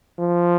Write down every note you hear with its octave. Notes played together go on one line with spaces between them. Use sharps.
F3